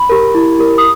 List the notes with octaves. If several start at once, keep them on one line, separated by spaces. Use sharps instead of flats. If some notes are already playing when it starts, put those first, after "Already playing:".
Already playing: B5
G4 A#4
E4
G4 A#4
D#6